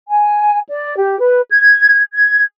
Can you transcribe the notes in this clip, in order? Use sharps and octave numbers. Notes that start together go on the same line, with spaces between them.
G#5
D5
G4
B4
G#6
G#6